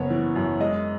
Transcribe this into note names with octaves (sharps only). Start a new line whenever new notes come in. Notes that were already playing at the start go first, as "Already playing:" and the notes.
Already playing: F#1 B3 C#5
E3
F#2
G#3 D#5